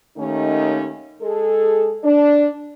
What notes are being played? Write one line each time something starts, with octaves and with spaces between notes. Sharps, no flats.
D#2 D#3 A3 C#4 D#4
G#3 G#4 A4
D4